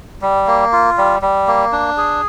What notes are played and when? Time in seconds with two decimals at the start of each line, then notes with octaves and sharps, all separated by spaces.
0.22 G3
0.47 A#3
0.73 F4
0.98 G3
1.22 G3
1.47 A#3
1.72 D4
1.97 G#4